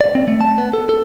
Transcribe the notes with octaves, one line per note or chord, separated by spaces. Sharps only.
D5
C4
A3
A5
B3
A4
A4